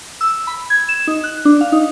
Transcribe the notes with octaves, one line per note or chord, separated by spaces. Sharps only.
E6
B5
G#6
E7
D#4
F#6
D4
F5
D#4